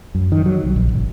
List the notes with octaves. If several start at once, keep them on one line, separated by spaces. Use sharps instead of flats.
F#2
D#3
F#3
C2
A#1
G1